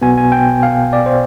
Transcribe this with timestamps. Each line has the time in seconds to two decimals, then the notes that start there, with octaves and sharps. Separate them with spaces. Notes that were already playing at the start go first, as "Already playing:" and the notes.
0.02 B1 B2 B3 G#5
0.18 G#5
0.32 G5
0.63 F5
0.93 D5
1.06 C5